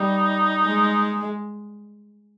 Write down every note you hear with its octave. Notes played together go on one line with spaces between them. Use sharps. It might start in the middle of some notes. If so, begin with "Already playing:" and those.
Already playing: G3 D#4
G#3